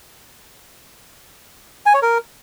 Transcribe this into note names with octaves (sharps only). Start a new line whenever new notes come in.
G#5
C#5
A#4